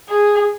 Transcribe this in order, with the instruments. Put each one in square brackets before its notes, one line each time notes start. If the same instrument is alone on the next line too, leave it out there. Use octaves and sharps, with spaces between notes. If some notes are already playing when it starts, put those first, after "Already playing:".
[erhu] G#4